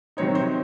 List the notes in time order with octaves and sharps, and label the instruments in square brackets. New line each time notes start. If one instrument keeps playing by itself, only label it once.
[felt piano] C3 D#3 F#3 C4 D#4 C#5
C5